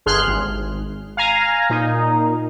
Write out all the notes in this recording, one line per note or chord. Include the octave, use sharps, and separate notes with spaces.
G1 G#4 C6 F6 F#6
G#1
F5 G#5 A#5
A#2 D#4